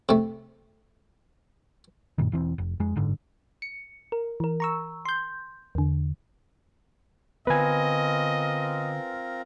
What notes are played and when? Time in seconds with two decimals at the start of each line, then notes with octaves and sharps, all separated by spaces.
0.09 C3 A3
2.18 F#2 A#2 D#3
2.32 E1 E3 C4
2.58 F1
2.80 F2 G#3
2.96 F#1 G#2 D3
3.62 C#7
4.12 A#4
4.40 E3 A#4
4.60 A#5 C#6 E6
5.05 C6 G6
5.75 E2 D3
7.47 D3 B3 C4 F4 A#4 B4 D#5 G#5